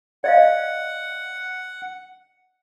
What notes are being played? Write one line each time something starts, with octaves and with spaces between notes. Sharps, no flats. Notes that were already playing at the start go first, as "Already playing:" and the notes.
D5 D#5 F5 F#5